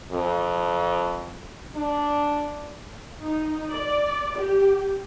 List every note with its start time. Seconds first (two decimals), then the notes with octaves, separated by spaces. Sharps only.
0.11 F2
1.75 D4
3.22 D#4
3.72 D5
4.38 G4